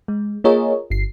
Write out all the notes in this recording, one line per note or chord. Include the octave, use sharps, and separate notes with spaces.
G#3
A#3 F4 G#4 A#4 C#5 D#5
G1 C7